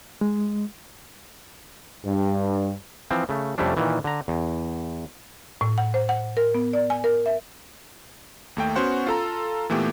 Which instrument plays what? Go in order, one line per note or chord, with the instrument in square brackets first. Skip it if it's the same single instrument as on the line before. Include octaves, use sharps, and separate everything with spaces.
[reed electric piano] G#3
[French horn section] G2
[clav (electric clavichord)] E3 F3 C4
C#3 A3
F2 C3 G3 A3 C#4 D4
A#2 D#3 E3
D3 A#5
E2
[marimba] A2
F#5
C5
F#5
A#4
B3
D5
G#5
A#4
E5
[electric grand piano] D#2 A3 G5
B3 C#4 F#4 C5 F#5
F4 A4 A#5
A#2 E3 A3 B3 G4